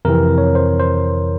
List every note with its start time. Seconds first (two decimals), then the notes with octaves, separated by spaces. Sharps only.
0.05 F2 C3 E3 A#4
0.38 C#5
0.55 C5
0.79 C5